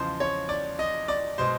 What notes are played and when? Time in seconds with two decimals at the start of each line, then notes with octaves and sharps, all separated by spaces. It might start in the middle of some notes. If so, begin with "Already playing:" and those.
Already playing: E2 C#3 F3 G#3 C5
0.20 C#5
0.49 D5
0.79 D#5
1.08 D5
1.38 B2 G#3 C5